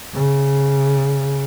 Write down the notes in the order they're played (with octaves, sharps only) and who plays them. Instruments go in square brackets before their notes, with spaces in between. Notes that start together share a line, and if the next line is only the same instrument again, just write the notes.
[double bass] C#3